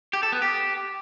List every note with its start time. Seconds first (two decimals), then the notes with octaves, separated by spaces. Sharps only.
0.13 G4
0.23 A4
0.32 B3
0.42 G4